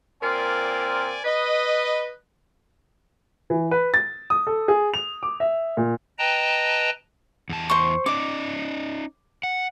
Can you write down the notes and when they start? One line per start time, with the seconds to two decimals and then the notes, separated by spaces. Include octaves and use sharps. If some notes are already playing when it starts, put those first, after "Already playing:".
0.22 A#2 C4 F4 A#4 D5 G#5
1.25 B4 D#5
3.50 E3
3.71 B4
3.94 A6
4.30 D#6
4.47 A4
4.68 G#4
4.94 F7
5.23 D6
5.40 E5
5.77 A#2
6.19 B4 D#5 G5 A5 A#5
7.49 E2 A5
7.70 C5 C#6
8.06 C#4 D#4 D5 D6
9.43 F#5